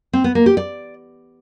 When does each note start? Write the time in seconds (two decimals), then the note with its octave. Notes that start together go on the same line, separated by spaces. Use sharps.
0.13 C4
0.24 B3
0.35 A#3
0.46 G4
0.57 D5